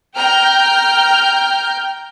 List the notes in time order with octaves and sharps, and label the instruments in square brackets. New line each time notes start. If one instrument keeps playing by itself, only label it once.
[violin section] G5 A#5 F6 G6